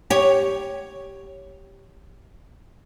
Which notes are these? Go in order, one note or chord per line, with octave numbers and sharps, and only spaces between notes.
G4 C#5